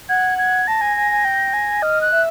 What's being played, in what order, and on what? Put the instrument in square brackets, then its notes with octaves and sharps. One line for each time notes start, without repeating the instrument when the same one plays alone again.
[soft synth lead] F#5 [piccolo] G#6
[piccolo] G#6
[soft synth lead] A5 [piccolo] A#6
[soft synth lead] G#5
G#5
G#5
G5
G#5
[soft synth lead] D#5 [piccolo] F6
[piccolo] F#6
[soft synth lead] E5